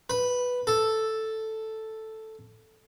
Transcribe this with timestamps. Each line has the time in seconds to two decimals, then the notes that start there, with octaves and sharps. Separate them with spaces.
0.10 B4
0.67 A4